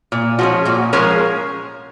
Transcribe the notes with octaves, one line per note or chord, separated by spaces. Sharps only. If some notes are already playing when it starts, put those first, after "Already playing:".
A#2
F3 G#3 C#4 F#4
A#2 F#4
F3 G#3 C#4 A#4